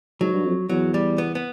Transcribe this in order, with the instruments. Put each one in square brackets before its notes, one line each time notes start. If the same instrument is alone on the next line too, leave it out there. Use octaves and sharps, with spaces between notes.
[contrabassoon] G#2 [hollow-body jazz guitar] F#3
[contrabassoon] G2
F2
[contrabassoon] E2 [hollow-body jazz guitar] F#3
[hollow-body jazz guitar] G3
B3
B3